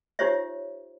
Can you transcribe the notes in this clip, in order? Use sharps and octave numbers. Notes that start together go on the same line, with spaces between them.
D#4 F4 G4 C5 C#5 E5